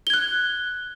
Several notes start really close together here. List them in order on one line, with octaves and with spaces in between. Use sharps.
G7 G#6 F#6